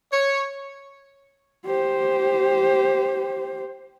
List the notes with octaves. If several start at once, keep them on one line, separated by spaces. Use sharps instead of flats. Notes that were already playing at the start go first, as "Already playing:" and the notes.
C#5
G4 C5